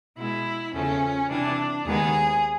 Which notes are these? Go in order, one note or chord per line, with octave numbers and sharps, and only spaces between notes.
B2 G#3 B3 E4
E2 C#3 F3 A3 C#4
C3 E3 G3 D4
D#2 D#3 G#3 B3 G#4